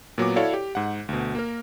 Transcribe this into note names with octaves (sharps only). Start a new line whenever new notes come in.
A#2 F#3 B3 D6
E4 F#4 A4 C#5 D5 F5
G4
G#2 F#5
D2 B2
A#3 A#4